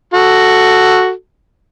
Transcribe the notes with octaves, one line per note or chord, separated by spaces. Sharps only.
F#4 A4